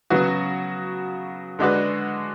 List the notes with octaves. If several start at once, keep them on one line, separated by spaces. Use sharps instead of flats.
C#3 F#3 B3 F#4 B4
D3 G#3 D4 F#4 B4